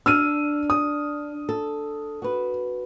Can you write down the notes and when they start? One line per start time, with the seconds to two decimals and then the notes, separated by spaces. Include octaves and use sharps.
0.06 D4 E6 F6 D#7
0.70 D#6
1.49 A4
2.22 F#4 B4